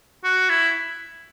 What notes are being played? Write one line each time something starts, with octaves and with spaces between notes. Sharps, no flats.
F#4
E4